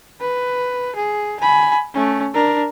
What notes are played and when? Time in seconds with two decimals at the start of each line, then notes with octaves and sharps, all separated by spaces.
0.20 B4
0.95 G#4
1.40 G#5 B5
1.94 A3 C#4
2.34 D4 A#4